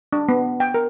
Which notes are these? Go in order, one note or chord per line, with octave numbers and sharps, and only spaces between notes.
D4
B3
G5
A#4